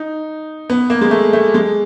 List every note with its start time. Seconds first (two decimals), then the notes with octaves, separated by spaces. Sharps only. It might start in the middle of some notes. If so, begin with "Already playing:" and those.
Already playing: D#4
0.70 B3
0.90 A#3
1.01 G#3
1.11 A3
1.33 A3
1.54 G#3